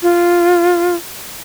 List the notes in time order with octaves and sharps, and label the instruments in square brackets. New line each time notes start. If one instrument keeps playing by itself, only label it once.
[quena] F4